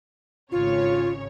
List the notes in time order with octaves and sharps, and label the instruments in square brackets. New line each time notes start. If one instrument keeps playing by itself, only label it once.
[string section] G#1 C#3 C#5 [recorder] F4